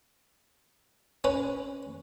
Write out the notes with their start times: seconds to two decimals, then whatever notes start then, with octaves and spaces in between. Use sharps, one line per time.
1.24 C#4 B4